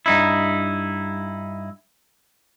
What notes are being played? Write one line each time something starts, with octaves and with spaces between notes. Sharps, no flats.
G2 D#4 E4